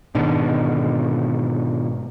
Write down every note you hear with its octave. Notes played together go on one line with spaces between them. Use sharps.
G#2 B2 D3 D#3